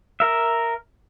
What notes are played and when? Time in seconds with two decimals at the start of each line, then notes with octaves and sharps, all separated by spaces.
0.20 A#4 E5